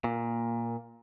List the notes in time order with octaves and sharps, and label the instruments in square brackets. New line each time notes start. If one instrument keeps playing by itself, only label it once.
[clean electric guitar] A#2 [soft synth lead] A#3